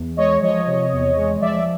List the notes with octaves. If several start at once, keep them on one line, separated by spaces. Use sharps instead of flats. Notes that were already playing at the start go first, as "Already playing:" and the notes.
Already playing: E2
G#3 C#5 D#5
F3 C#5 D#5
C3
E2
G#3
F3 D5 E5